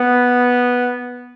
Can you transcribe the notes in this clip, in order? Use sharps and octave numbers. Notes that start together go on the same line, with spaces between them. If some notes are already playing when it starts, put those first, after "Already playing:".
Already playing: B3